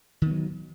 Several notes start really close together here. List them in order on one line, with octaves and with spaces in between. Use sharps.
D#3 B3 F#3